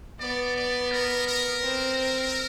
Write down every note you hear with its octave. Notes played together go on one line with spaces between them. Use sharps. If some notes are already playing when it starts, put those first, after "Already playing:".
B3 D5
D5
A#4
A#4
C4